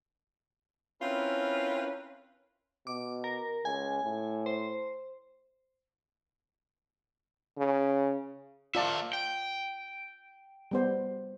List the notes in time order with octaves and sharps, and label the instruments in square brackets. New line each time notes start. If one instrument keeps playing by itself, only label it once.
[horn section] C4 C#4 E4 F4 A#4 B4
[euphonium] B2 [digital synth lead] D6
[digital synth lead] A#4
[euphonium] C#2 [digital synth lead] G#5
[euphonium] A2
[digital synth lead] C5
[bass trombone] C#3
[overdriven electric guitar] A#3 E5 [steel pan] F4 D5 A5
[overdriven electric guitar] G5
[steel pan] G3 B3 C5